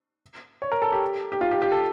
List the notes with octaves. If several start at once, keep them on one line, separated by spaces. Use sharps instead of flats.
C#5
A#4
A4
G4
G4
F4
G4
G4
A4